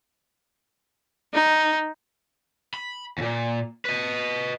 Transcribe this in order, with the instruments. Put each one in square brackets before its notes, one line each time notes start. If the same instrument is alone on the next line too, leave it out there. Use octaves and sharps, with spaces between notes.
[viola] D#4
[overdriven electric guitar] B5
D#2 A#2
B4 D#5